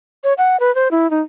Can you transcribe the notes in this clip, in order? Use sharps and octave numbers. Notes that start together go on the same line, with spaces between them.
C#5
F#5
B4
C5
E4
D#4